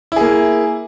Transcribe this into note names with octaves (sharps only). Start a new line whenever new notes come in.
A#3 E4 G#4